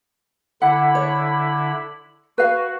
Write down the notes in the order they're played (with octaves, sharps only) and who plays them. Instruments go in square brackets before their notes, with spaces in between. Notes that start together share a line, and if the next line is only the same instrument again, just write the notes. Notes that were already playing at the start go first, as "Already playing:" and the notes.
[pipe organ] D3 E4 B5 [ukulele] F#5
[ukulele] C#5
[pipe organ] F#4 [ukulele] B4 F5